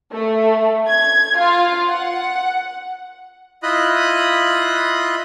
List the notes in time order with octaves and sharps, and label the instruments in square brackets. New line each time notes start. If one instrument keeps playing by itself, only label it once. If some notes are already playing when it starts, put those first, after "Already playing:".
[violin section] A3
G#6
F4
F#5
[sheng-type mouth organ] E4 F4 D#5 B5 D#6 F#6